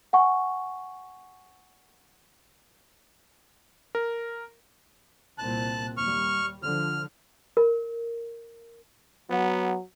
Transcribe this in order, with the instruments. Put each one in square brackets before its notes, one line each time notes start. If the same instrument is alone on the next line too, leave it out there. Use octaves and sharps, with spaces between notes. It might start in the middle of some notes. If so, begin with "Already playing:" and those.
[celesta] F#5 G#5 C#6
[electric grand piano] A#4
[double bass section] C2 A#2 C4 [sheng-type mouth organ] A5 F#6
[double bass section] D#2 G3 [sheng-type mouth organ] C#6 F6
[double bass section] D3 F3 [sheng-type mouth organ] F6
[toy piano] A#4
[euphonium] F#3 [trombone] B3